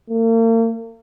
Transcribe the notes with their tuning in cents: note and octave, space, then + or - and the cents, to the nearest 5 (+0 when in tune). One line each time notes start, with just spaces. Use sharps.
A#3 -40